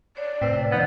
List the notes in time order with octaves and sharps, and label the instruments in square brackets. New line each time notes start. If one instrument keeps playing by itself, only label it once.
[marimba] C#5 [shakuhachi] D5
[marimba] F2 C3 B4 [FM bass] A2 [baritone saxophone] C4
[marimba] D#3 F3 B4 [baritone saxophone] B3 [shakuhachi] D#4